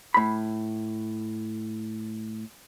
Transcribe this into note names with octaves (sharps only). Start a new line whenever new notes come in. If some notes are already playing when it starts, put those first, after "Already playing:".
A2 B5